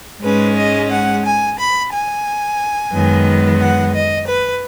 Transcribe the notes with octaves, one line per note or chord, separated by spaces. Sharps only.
G#2 G#3 C#4 B4
D#5
F#5
G#5
B5
G#5
F#2 D#3 G#3 B3
F#5
D#5
B4